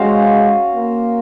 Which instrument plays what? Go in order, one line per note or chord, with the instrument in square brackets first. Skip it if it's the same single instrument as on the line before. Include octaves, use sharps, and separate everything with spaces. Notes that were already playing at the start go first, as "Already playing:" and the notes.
Already playing: [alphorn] G#3 [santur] C#4 F#4 C5 F5
[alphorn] A#3